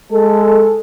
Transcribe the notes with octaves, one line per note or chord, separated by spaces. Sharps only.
G#3 A4